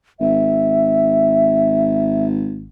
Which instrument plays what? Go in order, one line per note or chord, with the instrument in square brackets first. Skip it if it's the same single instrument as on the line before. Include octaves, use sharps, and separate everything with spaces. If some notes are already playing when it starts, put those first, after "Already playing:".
[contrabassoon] G#1 [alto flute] E5